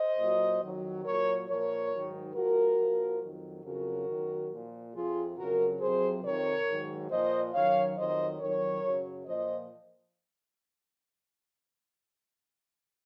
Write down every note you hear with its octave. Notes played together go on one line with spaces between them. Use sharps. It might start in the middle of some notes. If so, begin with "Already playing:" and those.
Already playing: C5 D#5
A#2 F#3
F2 D#3 F#3
A#2 F#3 A#4 C#5
A#2 F3 A#4 C#5
G#2 D#3 F#3
G#2 F3 F#4 A#4
A#2 F3
F2 D#3 F#3
F2 C#3 F#3 F#4 A#4
F#2 D#3 F#3
A#2 F3
F2 C3 F3 F4 G#4
F2 C#3 F#3 F#4 A#4
F2 C3 F#3 G#4 C5
F2 C3 D#3 A#4 C#5
G#2 D#3 F#3
A#2 F3 C5 D#5
F#2 D#3 F#3 C#5 F5
F2 D#3 F#3 C5 D#5
F2 D#3 F#3 A#4 C#5
F#2 C#3 F#3
A#2 F3 C5 D#5